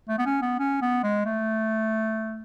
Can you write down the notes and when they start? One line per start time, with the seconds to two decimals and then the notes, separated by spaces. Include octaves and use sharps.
0.09 A3
0.19 B3
0.26 C#4
0.42 B3
0.59 C#4
0.82 B3
1.03 G#3
1.26 A3